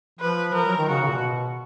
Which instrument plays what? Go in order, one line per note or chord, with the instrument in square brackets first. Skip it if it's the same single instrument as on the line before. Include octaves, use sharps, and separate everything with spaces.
[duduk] F3 [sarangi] B4
[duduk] F3 [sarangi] A#4
[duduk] F#3
D#3
[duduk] C#3 [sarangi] F#4
[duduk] C#3
A#2
B2